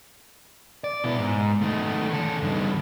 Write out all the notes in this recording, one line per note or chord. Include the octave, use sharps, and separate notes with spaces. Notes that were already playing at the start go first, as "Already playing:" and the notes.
D5
B2 E4
G#2
D#3 A3
C#3 A4
G2 D#3